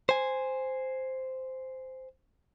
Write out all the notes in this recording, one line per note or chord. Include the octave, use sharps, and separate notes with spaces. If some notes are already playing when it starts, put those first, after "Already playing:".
C5 G#5